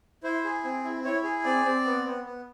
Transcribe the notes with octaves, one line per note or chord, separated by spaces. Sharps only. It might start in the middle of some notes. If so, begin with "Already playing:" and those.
E4 C5
G#4
C4
E4
E4 C#5
G#4
C4 D5
C4
B3
B3
B3